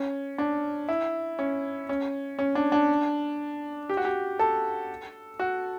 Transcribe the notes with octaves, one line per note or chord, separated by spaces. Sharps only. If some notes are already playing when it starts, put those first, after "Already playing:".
Already playing: C#4
D4
E4
C#4
C#4
C#4
D4
D4
G4
F#4
G4
A4
F#4